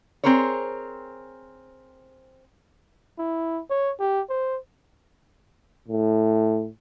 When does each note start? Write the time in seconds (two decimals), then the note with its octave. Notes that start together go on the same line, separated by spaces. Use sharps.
0.24 C4 G#4 A#4 C5 C#5
3.18 E4
3.70 C#5
4.00 G4
4.30 C5
5.88 A2